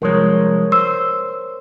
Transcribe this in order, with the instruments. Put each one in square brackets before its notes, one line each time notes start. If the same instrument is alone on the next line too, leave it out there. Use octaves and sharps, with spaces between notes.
[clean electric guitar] C2 F3 G#3 [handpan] A#4 C#5
[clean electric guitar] C5 [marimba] E6